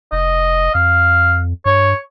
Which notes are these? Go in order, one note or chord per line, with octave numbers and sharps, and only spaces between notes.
F1 D#5
F2 F5
G2 C#5